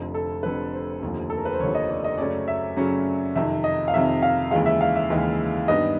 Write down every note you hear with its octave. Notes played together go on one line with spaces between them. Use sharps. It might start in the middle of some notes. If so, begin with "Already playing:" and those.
Already playing: F1 F2 D3
A4
F1 F2 D3 B4
C5
F1 D#2 D3 F3
A4
A#4
B4
C5
F1 D#2 D3 F3 C#5
D#5
D5
D#5
F#2 C#3 F#3 A3 C#4 D5
E5
F#2 C#3 F#3 A3 C#4
F2 C3 D#3 E5
D#5
F5
F2 C3 D#3 E5
F5
D#2 C#3 E3 G#3 F5
E5
F5
E5
D#2 C#3 E3 G#3
G2 D#3 G3 B3 D#5